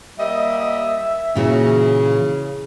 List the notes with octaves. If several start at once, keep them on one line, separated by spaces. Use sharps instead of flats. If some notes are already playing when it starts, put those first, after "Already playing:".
G3 A#3 D#5 E5
A#2 C#3 E3 F#4